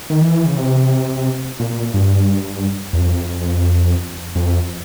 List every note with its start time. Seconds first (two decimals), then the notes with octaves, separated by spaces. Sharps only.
0.10 D#3
0.22 E3
0.46 C#3
0.56 C3
1.60 A#2
1.94 G2
2.93 E2
2.98 F2
4.35 F2